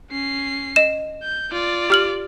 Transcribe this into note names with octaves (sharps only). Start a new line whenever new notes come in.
C#4 C7
D#5 E7
G6
F4 D5
G4 F6 F#7